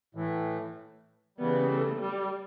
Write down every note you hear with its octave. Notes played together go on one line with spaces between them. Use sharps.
A2 E3 A3
C#3 E3 G3 B3
A3
G3